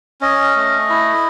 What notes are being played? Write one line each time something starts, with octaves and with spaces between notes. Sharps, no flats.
C#4 D#5
A3
E4